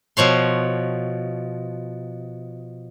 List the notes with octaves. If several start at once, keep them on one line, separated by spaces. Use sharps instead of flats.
B2 F3 C#5 C6